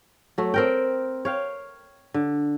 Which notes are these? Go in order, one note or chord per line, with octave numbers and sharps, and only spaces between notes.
F#3 A3
C4 A#4 G5
C#5 F5 G5
D3